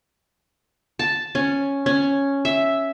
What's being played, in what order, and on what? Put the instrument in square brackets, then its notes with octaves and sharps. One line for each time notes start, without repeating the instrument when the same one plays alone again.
[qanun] A5
C#4
C#4
E5